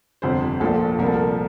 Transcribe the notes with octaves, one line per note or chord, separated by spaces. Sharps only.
G1 F2 C3 C5
A#1 A#2 F3 A4
C2 A#2 F3 A#4
A4
A#4